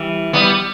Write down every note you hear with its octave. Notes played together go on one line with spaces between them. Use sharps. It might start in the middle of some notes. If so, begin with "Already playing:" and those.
Already playing: E3 G3
G3 B3